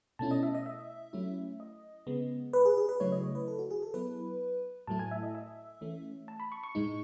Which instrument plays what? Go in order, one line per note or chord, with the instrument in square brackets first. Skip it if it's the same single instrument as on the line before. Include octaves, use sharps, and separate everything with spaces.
[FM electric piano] B2 A3 C#4 E4 A5
D#5
E5
D#5
E5
F#3 A3 C#4 E4
D#5
C#3 G#3 B3
B4
G#4
G#4
B4
C#3 F#3 A3 E4 C#5
D#5
C#5
B4
A4
F#4
G#4
A4
F#3 B3 E4 B4
A2 F#3 A3 E4 A5
G#5
E5
D#5
E5
E3 A3 C#4
A5
B5
C#6
C#6
A2 G#3 D#4